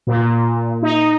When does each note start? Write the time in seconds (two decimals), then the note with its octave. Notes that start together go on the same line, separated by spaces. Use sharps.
0.07 A#2
0.82 D#4